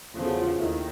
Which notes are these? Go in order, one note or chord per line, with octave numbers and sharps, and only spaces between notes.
E2 C#3 F3 A3 F4
F#4
F4
D#2 D#3 E4